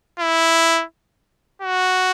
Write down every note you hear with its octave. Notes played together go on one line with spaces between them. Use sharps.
E4
F#4